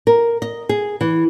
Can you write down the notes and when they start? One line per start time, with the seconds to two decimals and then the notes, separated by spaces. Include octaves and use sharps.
0.07 A#4
0.42 D#5
0.69 G#4
1.01 E3